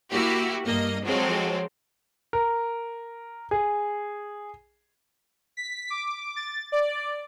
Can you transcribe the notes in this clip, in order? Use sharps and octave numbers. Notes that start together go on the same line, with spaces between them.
A#3 E4 F#4 G4
G2 A#3 D#5
F3 F#3 G#3 C4 A4
A#4
G#4
B6
D6
A6
D5